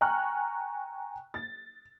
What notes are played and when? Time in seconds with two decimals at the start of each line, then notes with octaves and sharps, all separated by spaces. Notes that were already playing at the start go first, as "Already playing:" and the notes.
0.01 G5 G#5 A#5 C#6 F6 F#6
1.34 A6